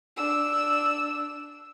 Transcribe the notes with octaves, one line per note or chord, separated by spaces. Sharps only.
D4 E6